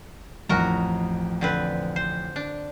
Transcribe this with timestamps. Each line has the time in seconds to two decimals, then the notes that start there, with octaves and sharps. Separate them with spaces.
0.49 A1 F2 F#4 A#4 A#5
1.41 D3 C4 B4
1.96 C5
2.36 D4